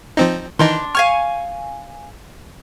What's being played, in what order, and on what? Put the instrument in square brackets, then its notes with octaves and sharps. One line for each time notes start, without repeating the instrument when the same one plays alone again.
[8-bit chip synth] F3 C4 D#4
[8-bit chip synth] D#3 E3 D#4 [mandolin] D4 C6
[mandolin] F5 G#5 C#6 [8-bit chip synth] F6